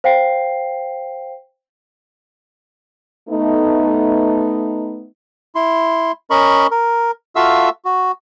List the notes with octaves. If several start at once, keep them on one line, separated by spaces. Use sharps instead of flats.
C5 F5 G5 C7
A3 B3 D#4
E4 C6
C#4 A#4 D#5 B5 C#6
A#4
F4 F#4 A4 E5 F5 E6
F#4